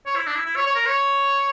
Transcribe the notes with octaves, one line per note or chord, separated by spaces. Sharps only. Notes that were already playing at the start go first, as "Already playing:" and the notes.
C#5
E4
D4
E4
E4
C#5
C#5
A#4
C#5